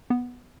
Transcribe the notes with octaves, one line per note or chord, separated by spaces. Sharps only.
B3